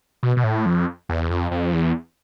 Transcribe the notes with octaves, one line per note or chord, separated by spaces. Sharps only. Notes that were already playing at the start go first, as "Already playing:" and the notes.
B2
B2
A2
F2
E2
F2
F2
E2